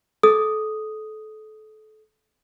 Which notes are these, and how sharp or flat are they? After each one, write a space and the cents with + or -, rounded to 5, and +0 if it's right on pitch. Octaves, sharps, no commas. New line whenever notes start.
A4 -25 D#6 +0